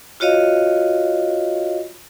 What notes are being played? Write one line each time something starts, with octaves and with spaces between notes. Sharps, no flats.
F4 F#4 C#5 D#5 F5